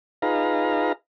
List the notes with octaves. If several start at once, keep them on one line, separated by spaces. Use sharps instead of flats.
D#4 F4 G#4 B4 F5 A#5